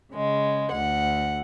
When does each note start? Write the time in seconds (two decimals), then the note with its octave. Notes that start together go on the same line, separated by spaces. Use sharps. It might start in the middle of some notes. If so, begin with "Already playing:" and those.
0.14 C#3 G#3
0.71 D2 F#5